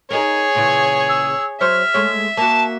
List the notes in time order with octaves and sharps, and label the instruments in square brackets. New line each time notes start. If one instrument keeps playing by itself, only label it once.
[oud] D#4 A#4 [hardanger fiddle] G#4 C#5
[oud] A#2 C#3 E3
[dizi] E6
[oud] F#3 C5 C#5 [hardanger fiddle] E5 [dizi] F6
[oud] G#3 A3 C#5
[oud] A#3 F#4 [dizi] A5